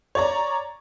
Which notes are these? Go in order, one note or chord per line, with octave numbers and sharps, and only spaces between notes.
C#5 D5 A#5